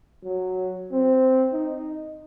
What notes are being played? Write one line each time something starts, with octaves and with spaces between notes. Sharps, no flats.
F#3
C4
D#4